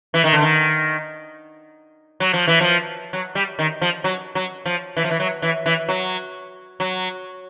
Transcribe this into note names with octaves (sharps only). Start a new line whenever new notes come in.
E3
D#3
D3
D#3
F#3
F3
E3
F3
F#3
G3
D#3
F3
F#3
F#3
F3
E3
F3
E3
F#3
E3
E3
F#3
F#3